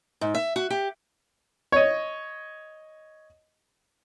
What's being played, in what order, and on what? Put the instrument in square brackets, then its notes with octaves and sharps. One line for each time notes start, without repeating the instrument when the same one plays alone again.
[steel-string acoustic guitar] G#2
E5
F#4
G4
[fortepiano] C#5 D#5